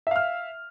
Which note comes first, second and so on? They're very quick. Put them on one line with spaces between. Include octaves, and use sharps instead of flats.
E5 F5 F6